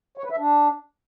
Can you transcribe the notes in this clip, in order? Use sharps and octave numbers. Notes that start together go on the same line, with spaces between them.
C#5
B4
E5
D4